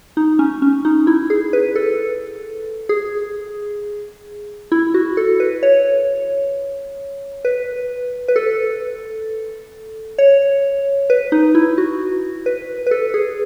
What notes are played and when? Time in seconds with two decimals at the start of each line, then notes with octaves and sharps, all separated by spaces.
0.17 D#4
0.39 C#4
0.62 C#4
0.85 D#4
1.07 E4
1.30 G#4
1.53 B4
1.76 A4
2.89 G#4
4.72 E4
4.94 F#4
5.17 A4
5.40 B4
5.63 C#5
7.45 B4
8.28 B4
8.36 A4
10.18 C#5
11.10 B4
11.32 D#4
11.55 E4
11.78 F#4
12.46 B4
12.87 B4
12.91 A4
13.14 G#4